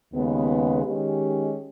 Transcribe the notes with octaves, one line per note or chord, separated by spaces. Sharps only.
D#2 C#3 G#3 B3
D#3 G#3 C#4 G4